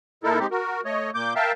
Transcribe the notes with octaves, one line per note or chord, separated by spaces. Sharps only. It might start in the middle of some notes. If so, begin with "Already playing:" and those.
A#2 D#4 E4 A4 A#4
G#3 C4 D#4 G4
F#4 A#4
A3 C#5 D#5
A#2 A#3 D6 G6
A#4 E5 F5 G5 A5